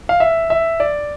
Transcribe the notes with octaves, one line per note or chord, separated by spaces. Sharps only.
F5
E5
E5
D5